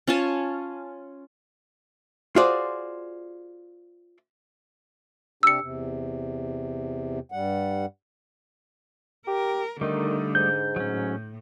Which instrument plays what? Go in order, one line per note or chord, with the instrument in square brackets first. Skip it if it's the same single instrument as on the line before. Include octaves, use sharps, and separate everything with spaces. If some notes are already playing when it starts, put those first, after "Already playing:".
[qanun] C#4 F4 G#5 A5
[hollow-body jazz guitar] F4 F#4 G#4 C5 D5
[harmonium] C3 D4 G4 [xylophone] E6 C#7
[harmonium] E2 C3
G2 G3 F#5
[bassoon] G4 [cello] A#4
[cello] D3 [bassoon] D#3 [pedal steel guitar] G3 A3 D#4
[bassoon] G#2 [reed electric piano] G6
[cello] A2 [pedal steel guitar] F#3 C#4